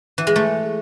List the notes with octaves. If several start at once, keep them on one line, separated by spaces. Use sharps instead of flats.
E3
G#3
A3